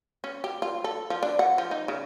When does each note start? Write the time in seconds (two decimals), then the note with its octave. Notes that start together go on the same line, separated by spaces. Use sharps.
0.24 C#4
0.44 G4
0.62 F4
0.84 A4
1.10 F3
1.23 D4
1.39 F#5
1.58 F3
1.71 D#4
1.88 C#3